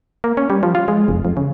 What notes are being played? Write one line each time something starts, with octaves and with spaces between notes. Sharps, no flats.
A#3
C#4
G3
F3
F4
G#3
F1
F2
C#3